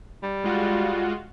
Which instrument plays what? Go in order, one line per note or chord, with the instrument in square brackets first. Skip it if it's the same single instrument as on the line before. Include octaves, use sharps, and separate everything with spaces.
[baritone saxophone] G3
[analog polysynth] G#3 F4 F#4